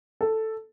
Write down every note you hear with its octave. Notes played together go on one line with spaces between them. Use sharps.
A4